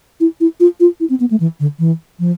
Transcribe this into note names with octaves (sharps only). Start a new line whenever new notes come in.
E4
E4
F4
F4
E4
C4
B3
A3
E3
D3
E3
F3